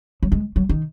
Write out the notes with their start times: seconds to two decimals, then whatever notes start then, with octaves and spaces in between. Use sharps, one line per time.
0.23 F#3
0.32 G#3
0.56 F#3
0.69 D#3